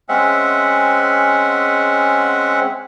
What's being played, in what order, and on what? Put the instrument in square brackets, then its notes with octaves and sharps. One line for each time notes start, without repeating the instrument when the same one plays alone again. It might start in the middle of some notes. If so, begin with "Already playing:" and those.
[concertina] G#3 C4 C#4 E5 F#5